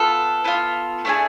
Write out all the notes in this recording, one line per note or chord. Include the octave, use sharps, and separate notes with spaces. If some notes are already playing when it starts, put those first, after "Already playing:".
Already playing: B3 F4 A4
B3 D4 F4
A3 D4 F4 G#4